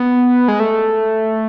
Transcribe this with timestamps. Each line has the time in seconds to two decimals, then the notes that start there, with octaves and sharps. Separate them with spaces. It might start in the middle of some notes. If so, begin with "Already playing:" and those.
Already playing: B3
0.48 G#3
0.60 A3